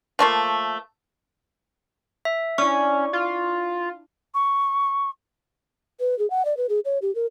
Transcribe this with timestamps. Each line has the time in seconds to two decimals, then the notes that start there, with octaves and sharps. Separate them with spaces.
0.19 F3 A3 A#3
2.25 E5
2.58 C#4 D4 E4 C#6
3.13 F4
4.34 C#6
6.00 B4
6.19 G#4
6.30 F#5
6.45 D5
6.57 B4
6.69 G#4
6.85 C#5
7.02 G4
7.15 A#4